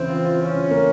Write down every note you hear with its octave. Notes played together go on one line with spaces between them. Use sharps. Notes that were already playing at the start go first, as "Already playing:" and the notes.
Already playing: C#3 E3 C4
F4
F4
C#4 F4
C#3
A#3